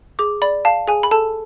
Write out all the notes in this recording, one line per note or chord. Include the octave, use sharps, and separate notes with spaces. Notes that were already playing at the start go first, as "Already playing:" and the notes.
G#4 D6
D5 B5
F5 A5
G#4 G#5
B5
A4 A5